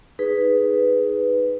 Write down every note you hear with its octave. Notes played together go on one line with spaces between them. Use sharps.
D#4 G#4 B4